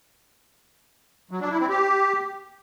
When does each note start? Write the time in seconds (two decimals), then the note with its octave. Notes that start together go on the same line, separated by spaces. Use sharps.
1.31 F#3
1.41 D4
1.50 E4
1.60 C4
1.70 G4